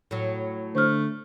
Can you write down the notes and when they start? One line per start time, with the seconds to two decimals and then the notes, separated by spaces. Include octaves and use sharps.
0.11 A2 F#3
0.75 D3 A3 C5 F6